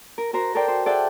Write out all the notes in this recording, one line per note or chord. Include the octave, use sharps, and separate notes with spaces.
A#4
F#4 A#4 C5 A#5
A4 A#4 C5 D5 G5
C5
G#4 A4 D5 E5 F#5 G5